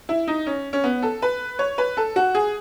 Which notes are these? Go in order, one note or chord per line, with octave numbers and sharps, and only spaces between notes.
E4
D#4
C#4
C#4
B3
A4
B4
C#5
B4
A4
F#4
G#4